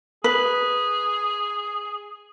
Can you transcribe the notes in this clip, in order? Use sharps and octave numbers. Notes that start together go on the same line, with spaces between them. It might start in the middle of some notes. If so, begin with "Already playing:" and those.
G#4 B4